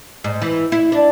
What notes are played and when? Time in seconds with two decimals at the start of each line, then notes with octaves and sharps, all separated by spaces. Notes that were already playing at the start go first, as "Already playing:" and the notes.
0.24 G#2
0.42 E3
0.72 E4
0.92 D4